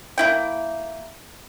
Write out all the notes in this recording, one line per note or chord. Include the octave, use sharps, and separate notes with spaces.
A#3 E4 G5